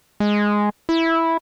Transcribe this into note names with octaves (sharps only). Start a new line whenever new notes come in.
G#3
E4